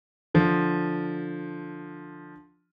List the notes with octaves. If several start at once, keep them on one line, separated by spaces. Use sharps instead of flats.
D3 F3